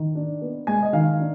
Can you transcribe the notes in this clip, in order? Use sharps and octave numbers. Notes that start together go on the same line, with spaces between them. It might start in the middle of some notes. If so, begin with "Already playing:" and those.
Already playing: D#3
D4
B3
G#3 G#5
D#5
D#3 F5
D4